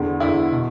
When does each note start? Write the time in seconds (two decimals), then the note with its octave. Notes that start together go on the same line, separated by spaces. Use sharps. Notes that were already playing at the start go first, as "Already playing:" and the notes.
Already playing: E2 D3
0.20 E2 D3 E4
0.51 B2